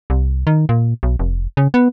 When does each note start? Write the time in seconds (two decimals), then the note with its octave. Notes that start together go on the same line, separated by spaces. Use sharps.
0.10 C2
0.47 D#3
0.69 A#2
1.03 B1
1.19 F1
1.57 C#3
1.74 B3